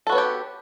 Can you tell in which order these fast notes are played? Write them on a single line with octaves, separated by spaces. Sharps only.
A4 F#4 B3 C#5 G4